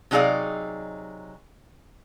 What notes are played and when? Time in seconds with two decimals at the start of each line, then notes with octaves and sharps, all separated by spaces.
0.11 C3 F#3 D#4 G#4 D5 F5